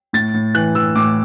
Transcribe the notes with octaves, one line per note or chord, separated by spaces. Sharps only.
A2 A6
A2
E3 F#6
E3 E6
A2 D6